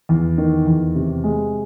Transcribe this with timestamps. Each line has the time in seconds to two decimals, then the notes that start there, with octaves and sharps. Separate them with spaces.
0.09 E2
0.38 D#3
0.67 E2
0.95 C3
1.24 G#3